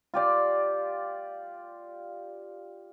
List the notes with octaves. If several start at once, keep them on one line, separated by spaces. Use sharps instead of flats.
F4 G4 D5